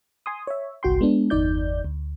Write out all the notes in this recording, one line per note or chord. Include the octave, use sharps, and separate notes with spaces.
G#5 C6 D#6
C#5 E5
G1 C2 F#4 G5 C6
G#3 B3 D4
G1 E2 D#4 D5 G6
D2